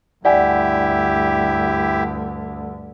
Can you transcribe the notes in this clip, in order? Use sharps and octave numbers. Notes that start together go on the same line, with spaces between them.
D2 G2 E4 G4 D5 F#5 G#5